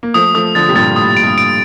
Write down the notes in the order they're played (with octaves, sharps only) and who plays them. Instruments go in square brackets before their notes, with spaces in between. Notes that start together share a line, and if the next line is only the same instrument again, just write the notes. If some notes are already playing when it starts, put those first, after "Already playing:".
[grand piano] A#3
[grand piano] F3 A3 [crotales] D#6
[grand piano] F3 A3 [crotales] D#6
[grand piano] D3 F3 [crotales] A6
[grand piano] C3
[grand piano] G2 A#2 [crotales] A6
[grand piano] A2 [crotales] D#6
[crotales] D7
[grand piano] G2
[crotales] D7